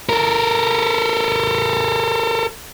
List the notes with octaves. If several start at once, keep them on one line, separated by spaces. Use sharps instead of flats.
A4 A#4